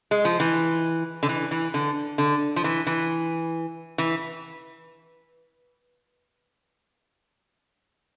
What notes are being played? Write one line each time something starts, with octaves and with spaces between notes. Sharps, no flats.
G#3
F3
E3
D3
E3
E3
D3
D3
F3
E3
E3
E3